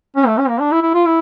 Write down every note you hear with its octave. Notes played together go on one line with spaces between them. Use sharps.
C#4
A3
C#4
A#3
D4
E4
E4
F4
E4